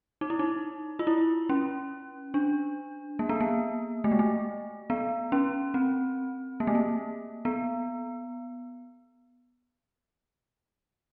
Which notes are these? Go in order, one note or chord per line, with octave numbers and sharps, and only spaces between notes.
D#4
E4
D#4
F4
E4
C#4
D4
A#3
B3
A#3
A3
G#3
A3
B3
C#4
C4
A#3
A3
A#3
B3